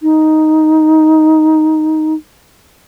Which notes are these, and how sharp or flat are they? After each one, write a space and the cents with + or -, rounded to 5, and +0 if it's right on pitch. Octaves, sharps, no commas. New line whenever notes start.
D#4 +5